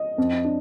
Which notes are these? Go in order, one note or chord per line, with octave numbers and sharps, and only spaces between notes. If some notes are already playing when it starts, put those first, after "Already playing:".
Already playing: D#5
F2
D4